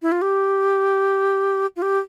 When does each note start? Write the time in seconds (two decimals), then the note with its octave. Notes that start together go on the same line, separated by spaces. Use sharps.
0.02 E4
0.12 F4
0.22 G4
1.76 F4
1.82 G4